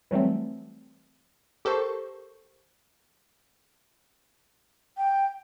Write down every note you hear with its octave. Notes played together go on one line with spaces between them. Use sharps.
E3 F#3 G3 A3 C4
G4 A4 A#4 C5 C#6
G5